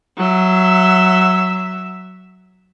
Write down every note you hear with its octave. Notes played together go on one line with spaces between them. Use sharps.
F#3 E5